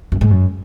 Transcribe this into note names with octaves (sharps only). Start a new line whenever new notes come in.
F#2
G#2
F#2